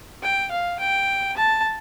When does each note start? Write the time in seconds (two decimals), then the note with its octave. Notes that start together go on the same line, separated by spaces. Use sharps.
0.23 G5
0.51 F5
0.79 G5
1.37 A5